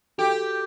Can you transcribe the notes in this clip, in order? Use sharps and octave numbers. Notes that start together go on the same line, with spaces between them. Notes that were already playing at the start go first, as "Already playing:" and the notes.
F#4 G4 A4